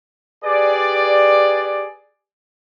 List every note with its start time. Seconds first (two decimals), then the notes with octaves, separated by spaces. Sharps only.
0.45 G4 G#4 B4 D5